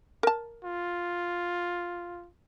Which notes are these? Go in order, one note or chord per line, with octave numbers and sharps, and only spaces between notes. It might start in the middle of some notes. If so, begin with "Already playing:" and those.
A#4 A5
F4